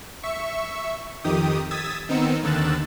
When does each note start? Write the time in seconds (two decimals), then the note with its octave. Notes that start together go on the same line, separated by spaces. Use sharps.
0.23 E5 C#6
1.24 F2 D#3 G4 D#6
1.71 D#6 E6 G#6 A6 B6
2.09 D#3 B3 C4 D#4 E6 C#7
2.43 D#2 D3 D#3 E6 F#6 A6